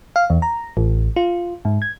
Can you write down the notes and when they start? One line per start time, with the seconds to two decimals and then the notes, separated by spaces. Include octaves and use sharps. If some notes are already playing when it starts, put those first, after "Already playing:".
0.16 F5
0.30 E2
0.42 A#5
0.77 A1
1.16 F4
1.65 G#2
1.82 G#6